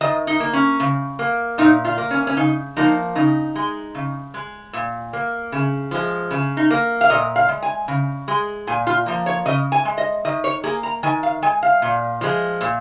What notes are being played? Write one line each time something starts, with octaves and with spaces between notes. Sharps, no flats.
D#3 D#5
D#4
A#3
C#4
C#3
A#3
A#2 D#4
F4
A#3
C#4
C#4
C#3 D#4
F3 A#3 D#4
C#3 D#4
G#3
C#3
G#3
A#2
A#3
C#3
F3 G#3
C#3
D#4
A#3
F5
A#2 D#5
F5
G#3
G#5
C#3
G#3
A#2 G#5
F4
F3 A#3
C#5
C#3 D#5
G#5
G#3
D#5
D#3 D#5
C#5
A#3 G#4
A#5
D#3 G#5
F5
G#3 G#5
F5
A#2
F3 G#3
A#2